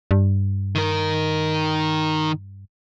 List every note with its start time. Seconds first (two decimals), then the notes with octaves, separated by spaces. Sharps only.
0.11 G2
0.75 D#3 A#4